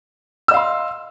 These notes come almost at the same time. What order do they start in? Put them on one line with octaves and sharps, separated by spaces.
E6 D#5 F5 C6